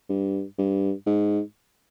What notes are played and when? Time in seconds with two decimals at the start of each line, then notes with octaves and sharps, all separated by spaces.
0.09 G2
0.58 G2
1.06 G#2